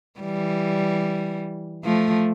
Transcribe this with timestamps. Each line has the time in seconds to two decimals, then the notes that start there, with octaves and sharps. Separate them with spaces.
0.20 E3 G3
1.84 F3 A3